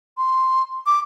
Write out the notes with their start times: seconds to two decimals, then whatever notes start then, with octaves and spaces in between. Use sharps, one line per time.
0.18 C6
0.86 D6